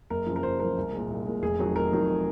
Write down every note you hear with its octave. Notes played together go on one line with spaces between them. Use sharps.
F#1 A#4
F#2 C#3 F3
A#4
F#1 C5
F#2 C#3 F3 A#4
C2
A#2 G#3
C2
A#2 G#3
F1 G#4
F2 D#3 F#3
F1 A#4
F2 D#3 F#3